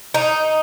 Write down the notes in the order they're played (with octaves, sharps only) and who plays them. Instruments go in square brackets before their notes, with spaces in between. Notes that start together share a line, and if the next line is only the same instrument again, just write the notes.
[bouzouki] D#4